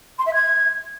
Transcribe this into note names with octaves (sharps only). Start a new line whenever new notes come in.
C6
E5
G#6